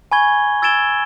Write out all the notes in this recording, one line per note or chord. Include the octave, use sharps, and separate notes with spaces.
G#5 B5 C#6 G#6 G7
E6 G#6 A6 D7 E7 G7